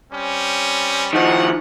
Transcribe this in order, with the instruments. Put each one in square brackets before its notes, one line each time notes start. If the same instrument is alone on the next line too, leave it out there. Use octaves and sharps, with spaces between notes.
[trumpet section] G3 C4 C#4
[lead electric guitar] D#3 F3 [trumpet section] F#5